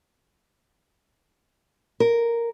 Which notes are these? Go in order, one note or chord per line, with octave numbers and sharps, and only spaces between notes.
A#4